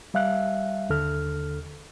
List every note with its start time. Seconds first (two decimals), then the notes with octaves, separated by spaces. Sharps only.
0.14 G3 E5 F5 F#6
0.89 D#2 D3 A4 F6